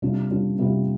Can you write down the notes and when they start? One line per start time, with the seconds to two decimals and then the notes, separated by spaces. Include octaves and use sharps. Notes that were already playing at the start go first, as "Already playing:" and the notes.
0.02 C3 G3 D4 F4
0.30 C3 G3 D4 F4
0.59 C3 G3 D4 F4